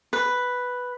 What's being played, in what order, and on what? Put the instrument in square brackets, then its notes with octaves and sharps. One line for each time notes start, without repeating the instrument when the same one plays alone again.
[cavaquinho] B4